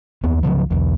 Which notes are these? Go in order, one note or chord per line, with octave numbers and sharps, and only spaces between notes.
D#2 B3
C#2 C#3 F3 F#3
B1 E2